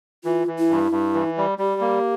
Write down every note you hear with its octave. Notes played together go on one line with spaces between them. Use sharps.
E3 F4
E3
E4
G2
G2
E3
G3
G3 G4
A#3